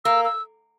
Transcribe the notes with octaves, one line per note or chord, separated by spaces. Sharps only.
A#3 E6
E6